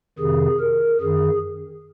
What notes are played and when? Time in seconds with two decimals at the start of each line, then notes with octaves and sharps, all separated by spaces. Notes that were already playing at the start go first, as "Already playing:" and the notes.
0.18 F2 C3 D#3 G#4
0.60 A#4
1.01 F#2 D#3 G#4